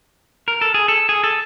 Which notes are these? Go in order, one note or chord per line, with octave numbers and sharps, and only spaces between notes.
A#4
A4
G#4
A4
G#4
A4